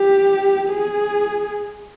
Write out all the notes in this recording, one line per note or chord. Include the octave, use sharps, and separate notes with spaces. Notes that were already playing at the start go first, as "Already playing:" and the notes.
Already playing: G4
G#4